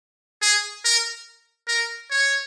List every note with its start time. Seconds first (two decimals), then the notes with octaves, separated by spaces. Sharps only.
0.42 G#4
0.85 A#4
1.68 A#4
2.10 C#5